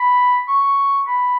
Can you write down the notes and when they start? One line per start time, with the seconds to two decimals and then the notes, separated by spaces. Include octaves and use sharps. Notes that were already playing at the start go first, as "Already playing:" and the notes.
Already playing: B5
0.48 C#6
1.07 B5